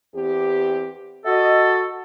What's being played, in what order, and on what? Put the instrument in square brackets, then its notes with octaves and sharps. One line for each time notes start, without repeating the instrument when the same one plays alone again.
[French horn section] E2 C4 G4
[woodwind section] F#4 A4 [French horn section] D#5